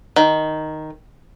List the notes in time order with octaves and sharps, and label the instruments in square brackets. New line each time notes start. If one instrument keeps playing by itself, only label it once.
[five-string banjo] D#3